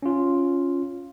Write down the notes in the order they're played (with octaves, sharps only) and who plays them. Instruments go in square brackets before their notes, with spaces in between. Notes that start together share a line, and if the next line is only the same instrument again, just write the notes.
[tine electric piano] C#4 F4